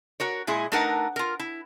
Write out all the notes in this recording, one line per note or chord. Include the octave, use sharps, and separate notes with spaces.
F#4 A#4 C#5
A#2 G#3 E4 G#4
A3 D4 D#4 A#4 B4 F#5
F4 A#4
E4